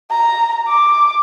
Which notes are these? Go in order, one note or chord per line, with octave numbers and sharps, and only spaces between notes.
A#5
D6